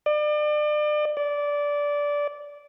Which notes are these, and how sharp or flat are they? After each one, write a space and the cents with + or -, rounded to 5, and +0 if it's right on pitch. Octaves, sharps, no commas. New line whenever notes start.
D5 +35
D5 -15